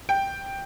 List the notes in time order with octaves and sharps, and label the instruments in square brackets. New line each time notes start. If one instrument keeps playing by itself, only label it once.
[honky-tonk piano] G5